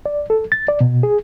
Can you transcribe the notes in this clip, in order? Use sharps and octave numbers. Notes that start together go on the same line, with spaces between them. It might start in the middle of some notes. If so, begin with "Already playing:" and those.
D5
A4
A6
D5
B2
G#4